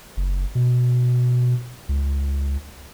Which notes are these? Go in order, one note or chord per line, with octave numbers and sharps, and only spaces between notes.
F#1
B2
C#2